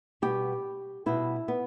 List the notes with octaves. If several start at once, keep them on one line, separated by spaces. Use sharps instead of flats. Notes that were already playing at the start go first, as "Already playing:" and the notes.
B2 G3 B3 G4
B2 G3 B3 E4
B3